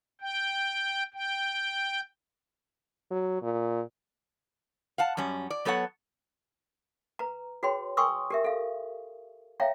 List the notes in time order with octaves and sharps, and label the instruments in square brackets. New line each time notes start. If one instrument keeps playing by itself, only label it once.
[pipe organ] G5
G5
[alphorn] F#3
A#2
[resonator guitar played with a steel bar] F5 F#5 A5
F#2 G3 C#4
D5
F#3 B3 A4 C#5 F#5
[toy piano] B4 A#5
F#4 G#4 B4 C#5 G5 C6
G5 G#5 C6 C#6 D#6 E6
G4 A#4 E5
A4 F5
C#5 E5 F5 G5 A#5